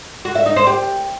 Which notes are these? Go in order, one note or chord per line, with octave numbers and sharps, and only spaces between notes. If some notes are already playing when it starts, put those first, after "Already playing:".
F#4
E5
D#4
C5
G4